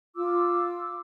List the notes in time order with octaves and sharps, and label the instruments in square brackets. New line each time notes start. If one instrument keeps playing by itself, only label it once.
[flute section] F4 D6 E6